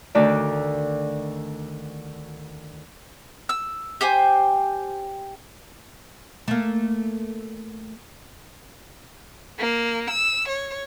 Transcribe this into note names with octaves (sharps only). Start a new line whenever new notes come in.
D2 D3 D#3 D5
E6
G4 C5 G5 G#5
A3 A#3
A#3
E6
C#5